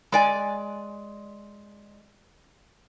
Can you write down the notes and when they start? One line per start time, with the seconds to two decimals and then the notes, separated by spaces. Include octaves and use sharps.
0.12 G#3 D5 G#5